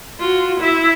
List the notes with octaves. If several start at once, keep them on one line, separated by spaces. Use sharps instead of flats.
F4 F#4
E4 E5